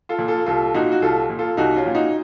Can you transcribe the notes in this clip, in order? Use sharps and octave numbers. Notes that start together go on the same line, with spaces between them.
F4 A4
A#2
F4 A4
C2 F4 A4
A#2 D#4 F#4
F#4
C2 F4 A4
A#2
F4 A4
C2 D#4 F#4
C#4 F4
A#2
D#4 F#4